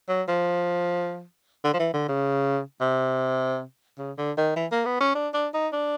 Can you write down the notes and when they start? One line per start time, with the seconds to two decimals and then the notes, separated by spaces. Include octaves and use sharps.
0.09 F#3
0.28 F3
1.64 D3
1.73 F3
1.79 E3
1.93 D3
2.09 C#3
2.81 C3
3.98 C#3
4.18 D3
4.37 D#3
4.56 E3
4.72 A#3
4.85 B3
5.00 C#4
5.15 D4
5.34 D4
5.54 D#4
5.73 D4